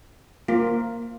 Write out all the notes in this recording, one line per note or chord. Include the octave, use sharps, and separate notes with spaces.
A#3 F4